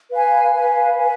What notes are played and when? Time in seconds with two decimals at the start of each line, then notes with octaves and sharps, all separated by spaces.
0.10 B4 F5 G#5
0.54 B4 F5 G#5
0.98 B4 F5 G#5